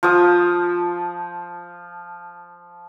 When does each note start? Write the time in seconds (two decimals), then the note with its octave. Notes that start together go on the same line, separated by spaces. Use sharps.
0.03 F3 D#6